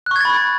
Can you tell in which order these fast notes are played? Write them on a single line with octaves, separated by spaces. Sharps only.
F#6 C#6 G#6 A6 B5